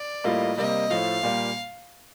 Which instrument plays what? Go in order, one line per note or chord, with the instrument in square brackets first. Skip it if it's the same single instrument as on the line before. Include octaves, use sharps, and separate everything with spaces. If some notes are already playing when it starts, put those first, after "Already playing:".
Already playing: [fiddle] D5
[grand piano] A2 G3 A#3 F4 [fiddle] D#5
[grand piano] C3 G3 A#3 [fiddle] D#5
[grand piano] A2 F3 A3 [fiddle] F5
[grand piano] A#2 G3 A#3